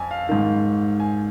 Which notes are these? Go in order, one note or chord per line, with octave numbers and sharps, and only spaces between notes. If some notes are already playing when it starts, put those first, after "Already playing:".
Already playing: F2 G#5
F5
G#2 D#3 F5
G#5